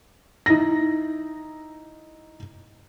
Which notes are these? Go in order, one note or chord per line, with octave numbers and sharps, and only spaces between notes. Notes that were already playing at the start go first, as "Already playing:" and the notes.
D#4 E4 A#6